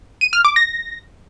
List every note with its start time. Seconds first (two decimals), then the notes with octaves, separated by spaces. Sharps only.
0.21 D#7
0.33 F6
0.45 D6
0.56 A#6